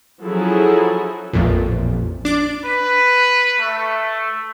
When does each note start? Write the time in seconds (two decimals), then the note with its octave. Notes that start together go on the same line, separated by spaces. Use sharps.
0.22 F3 F#3 C#4 E4 G#4 A4
1.33 A1 F2 A#2
2.25 D4 D6
2.65 B4
3.60 A3